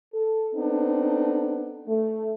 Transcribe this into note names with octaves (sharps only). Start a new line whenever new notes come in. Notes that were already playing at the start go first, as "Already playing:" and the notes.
A4
B3 C4 D4 D#4 A4
A3